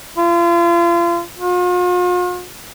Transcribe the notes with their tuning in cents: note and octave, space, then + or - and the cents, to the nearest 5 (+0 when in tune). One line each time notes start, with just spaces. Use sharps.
F4 -35
F4 +45